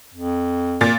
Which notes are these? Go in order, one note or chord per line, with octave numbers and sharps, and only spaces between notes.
F2
A#2 A6